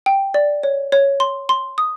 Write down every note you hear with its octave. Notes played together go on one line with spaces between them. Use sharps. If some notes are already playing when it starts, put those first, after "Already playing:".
G5
D5
C#5
C#5
C6
C6
D#6